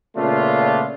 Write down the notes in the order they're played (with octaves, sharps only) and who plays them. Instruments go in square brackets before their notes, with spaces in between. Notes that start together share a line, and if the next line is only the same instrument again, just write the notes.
[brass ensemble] A#2 C#3 A3 B3 D4 F4